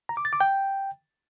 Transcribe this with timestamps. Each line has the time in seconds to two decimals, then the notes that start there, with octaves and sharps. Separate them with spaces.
0.09 A#5
0.17 D6
0.25 A6
0.33 D6
0.41 G5